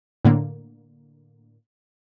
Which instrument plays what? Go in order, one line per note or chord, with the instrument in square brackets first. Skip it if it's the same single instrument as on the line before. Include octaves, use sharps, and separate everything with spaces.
[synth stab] A2 D3 A#3